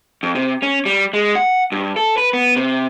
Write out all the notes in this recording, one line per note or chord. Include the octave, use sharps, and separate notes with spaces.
F2
C3
C#4
G3
G#3
F#5
G2
A4
B4
B3
C3